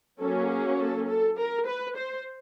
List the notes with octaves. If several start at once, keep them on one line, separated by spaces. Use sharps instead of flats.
F#3 A#3 C#4 A4
G#4
A4
A4
A#4
B4
C5